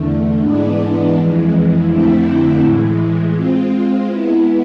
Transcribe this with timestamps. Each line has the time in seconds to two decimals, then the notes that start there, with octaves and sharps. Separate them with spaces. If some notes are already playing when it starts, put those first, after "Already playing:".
Already playing: E2 D3 A3
0.41 G#2 E3 G#3 B3 D4
1.14 F2 E3 G#3
1.88 F2 D3 A3 C4 E4
2.60 A2 E3 G#3
3.33 G#3 C4 F4
4.07 G#3 B3 E4